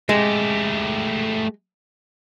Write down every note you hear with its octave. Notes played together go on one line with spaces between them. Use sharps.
G#3 A3 G4